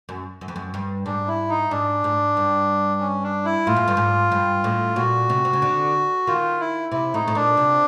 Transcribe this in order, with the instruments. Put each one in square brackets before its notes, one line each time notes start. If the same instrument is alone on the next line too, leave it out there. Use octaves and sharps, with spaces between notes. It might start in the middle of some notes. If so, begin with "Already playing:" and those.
[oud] F#2
F#2
F2
F#2
G2
[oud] G#2 [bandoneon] D4
[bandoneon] E4
D#4
[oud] G#2 [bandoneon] D4
[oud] G#2
G2
[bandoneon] C#4
D4
E4
[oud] A2 [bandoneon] F4
[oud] G#2
G2
G#2
G2
A2
[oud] A#2 [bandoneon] F#4
[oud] C3
C3
C#3
D3
[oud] D#3 [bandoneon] F4
[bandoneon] E4
[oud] C3 [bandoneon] E4
[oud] A2 [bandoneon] D#4
[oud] A2
[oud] A#2 [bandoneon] D4
[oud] C3